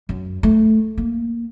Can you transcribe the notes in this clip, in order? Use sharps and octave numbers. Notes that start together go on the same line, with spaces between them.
F#2
A3
A#3